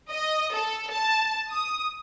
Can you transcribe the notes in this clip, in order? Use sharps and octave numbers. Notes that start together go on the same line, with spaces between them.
D#5
A4
A5
D#6